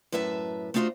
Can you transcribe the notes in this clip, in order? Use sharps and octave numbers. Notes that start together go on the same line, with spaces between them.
F#2 A2 B4 E5 A5
A3 D4 D#4 F4 F#4 C5